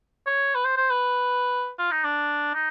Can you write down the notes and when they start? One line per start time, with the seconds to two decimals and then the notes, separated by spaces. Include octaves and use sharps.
0.27 C#5
0.55 B4
0.65 C5
0.77 C5
0.91 B4
1.79 F4
1.91 D#4
2.04 D4
2.54 D#4